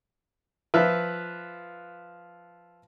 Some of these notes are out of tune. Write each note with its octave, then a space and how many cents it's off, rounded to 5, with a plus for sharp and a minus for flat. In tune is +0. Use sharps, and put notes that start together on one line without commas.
F3 +0 B4 +0 E5 +0